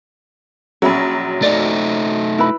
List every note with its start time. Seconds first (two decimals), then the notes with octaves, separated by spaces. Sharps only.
0.82 A#1 F#3 C#4 E5 B5
1.42 A3 D#4 D5
2.39 E4 B4 B5